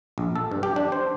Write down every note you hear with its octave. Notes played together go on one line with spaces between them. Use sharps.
A#1
A4
G2
G4
D4
C5